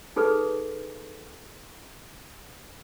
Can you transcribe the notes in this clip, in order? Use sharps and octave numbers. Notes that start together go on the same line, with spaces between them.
D#4 G#4 A4 B4